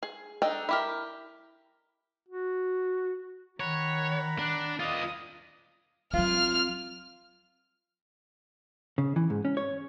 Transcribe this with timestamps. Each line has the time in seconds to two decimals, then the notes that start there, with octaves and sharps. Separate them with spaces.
0.03 G#4
0.42 D4 D#4 A4 G5
0.69 E4 G4 A#4
2.28 F#4
3.60 D#3 C#5 F#5 A#5 B5
4.39 D4
4.80 F4 D5 D#5 D#6
6.14 F#3 C4 F4 F6
8.98 C#3
9.16 E3
9.30 G#2
9.45 C#4
9.57 C#5